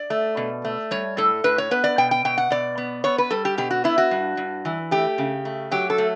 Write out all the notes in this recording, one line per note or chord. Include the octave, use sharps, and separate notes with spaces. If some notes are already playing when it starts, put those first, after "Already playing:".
Already playing: D5
A3
B2
A3
G3 C#5
A2 A4
A2 B4
C#5
B3 B4
D5
B2 G5
G5
B2 G5
F#5
B2 D5
B3
B3 C#5
B4
G3 A4
G4
B2 G4
F#4
B3 E4
F#4
G2
G2
E3
A3 G4
C#3
A3
F#3 G4
A4
A3